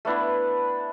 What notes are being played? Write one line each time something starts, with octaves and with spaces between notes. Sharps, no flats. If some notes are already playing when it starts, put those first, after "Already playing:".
A3 B3 D4 E4